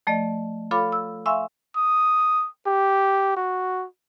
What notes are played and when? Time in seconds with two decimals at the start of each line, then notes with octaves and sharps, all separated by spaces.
0.07 F3 A3 D5 D#5
0.71 F4 A4 C#5 F5 B5 D6
0.92 E6
1.26 E5 F5 G#5 C6 C#6 E6
1.77 D#6
2.67 G4
3.37 F#4